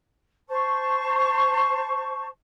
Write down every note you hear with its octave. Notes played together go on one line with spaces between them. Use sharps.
C5 A5 C#6